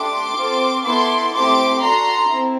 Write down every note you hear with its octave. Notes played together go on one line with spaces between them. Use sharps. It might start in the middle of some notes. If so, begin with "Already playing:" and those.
Already playing: A3 D4 G4 C6 D6
C4 F4 A4
B3 E4 A4 C6 D6
A3 C4 E4 G4 C6 D6
D4 F#4 A4 A#5 C6
C4 E4